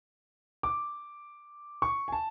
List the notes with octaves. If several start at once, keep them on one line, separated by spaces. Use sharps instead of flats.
D6
C#6
G#5
A5